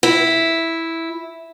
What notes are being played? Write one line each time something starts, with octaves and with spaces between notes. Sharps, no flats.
E4